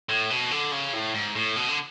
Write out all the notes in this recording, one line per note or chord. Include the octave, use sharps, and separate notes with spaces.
A2
B2
D3
C#3
A2
G#2
A2
B2
D3